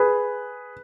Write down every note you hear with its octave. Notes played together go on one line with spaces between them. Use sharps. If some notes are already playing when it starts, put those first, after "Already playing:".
Already playing: G#4 B4